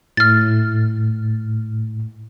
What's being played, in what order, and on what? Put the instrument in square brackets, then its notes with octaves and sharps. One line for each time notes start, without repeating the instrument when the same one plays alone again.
[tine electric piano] A2 [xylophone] F6 A6